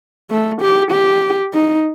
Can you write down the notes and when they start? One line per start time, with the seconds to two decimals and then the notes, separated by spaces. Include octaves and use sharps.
0.31 A3
0.62 G4
0.92 G4
1.53 D#4